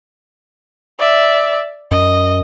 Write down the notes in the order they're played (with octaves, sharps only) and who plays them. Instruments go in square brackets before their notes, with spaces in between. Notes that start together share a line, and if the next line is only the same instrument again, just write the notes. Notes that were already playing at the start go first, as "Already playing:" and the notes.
[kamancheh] D5 E5
[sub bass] F#2 [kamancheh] D#5